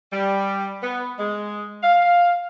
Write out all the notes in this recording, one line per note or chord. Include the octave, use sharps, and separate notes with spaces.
G3
B3
G#3
F5